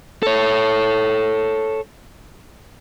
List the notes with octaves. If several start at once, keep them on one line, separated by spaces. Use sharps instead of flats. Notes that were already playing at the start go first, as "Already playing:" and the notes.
A4 C#5